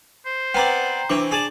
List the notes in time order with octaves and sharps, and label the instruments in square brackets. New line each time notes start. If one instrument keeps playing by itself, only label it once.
[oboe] C5
[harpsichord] B3 C4 D5 [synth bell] G5 A#5
[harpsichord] E3 C4 [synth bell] D4 D6
[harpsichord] G#4 D5 A5